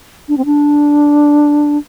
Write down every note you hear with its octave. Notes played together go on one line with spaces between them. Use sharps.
D4
C4
D4